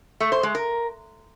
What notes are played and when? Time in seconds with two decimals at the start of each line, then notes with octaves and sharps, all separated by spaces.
0.20 A3
0.32 C5
0.43 G#3
0.55 A#4